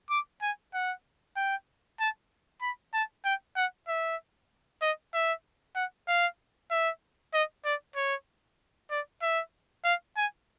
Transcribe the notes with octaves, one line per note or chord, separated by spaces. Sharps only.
D6
G#5
F#5
G5
A5
B5
A5
G5
F#5
E5
D#5
E5
F#5
F5
E5
D#5
D5
C#5
D5
E5
F5
G#5